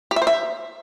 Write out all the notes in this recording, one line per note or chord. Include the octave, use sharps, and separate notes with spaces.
G4
E5
C5
E5